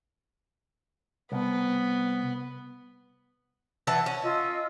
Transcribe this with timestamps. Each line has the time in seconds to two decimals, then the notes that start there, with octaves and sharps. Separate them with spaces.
1.32 C2 B3
3.87 E3 F#5 A5
4.06 C#4
4.23 F4 D#5 E6